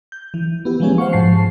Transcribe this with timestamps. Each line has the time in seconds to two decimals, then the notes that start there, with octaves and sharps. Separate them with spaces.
0.12 G6
0.34 E3
0.65 B3 E4 G4
0.80 E3 F3 G#3 B3 C#4 G#4
0.98 C5 F5 F#5 C#6
1.13 G#2 F3 A5 C7